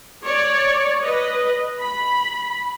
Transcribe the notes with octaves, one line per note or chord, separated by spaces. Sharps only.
C#5 D5
B4 D#5
B5